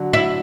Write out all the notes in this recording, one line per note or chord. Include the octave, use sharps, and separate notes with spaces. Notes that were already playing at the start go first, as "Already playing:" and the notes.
Already playing: D3 F#3
E4